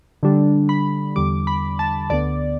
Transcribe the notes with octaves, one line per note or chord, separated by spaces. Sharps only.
D3 G3 D4
B5
E2 D3 G3 D6
B5
A5
D2 D3 B3 D5